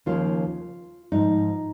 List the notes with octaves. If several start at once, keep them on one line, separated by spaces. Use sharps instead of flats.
D#2 C#3 F3 F4
G#2 F3 D#4